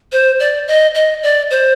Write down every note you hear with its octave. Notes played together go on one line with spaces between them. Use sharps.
C5
D5
D#5
D#5
D5
C5